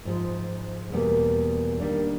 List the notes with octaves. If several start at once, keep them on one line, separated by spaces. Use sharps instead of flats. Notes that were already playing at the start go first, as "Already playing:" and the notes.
G#2 F3 G#3
E2 B2 G3 A#3
D#3 G3 A#3 D4